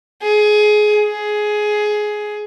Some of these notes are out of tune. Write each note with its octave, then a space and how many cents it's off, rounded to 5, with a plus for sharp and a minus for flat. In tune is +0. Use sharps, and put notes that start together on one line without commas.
G#4 +20
G#4 +15